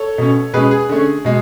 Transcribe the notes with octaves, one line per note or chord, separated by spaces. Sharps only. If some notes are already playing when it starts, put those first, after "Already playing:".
Already playing: A4 C#5
B2 A3 C#4
B2 G#3 C#4 G#4 B4
G#4
D3 A3 C#4
B2 G#3